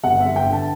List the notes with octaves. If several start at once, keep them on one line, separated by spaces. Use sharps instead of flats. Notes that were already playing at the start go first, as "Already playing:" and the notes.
G1 F#5
E5
G1
G5
D3
A5